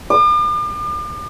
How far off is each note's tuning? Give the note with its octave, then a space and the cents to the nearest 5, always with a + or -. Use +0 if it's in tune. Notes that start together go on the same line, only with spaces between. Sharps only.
D6 +45